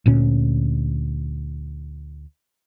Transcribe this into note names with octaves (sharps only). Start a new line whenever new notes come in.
D2 A#2 C#4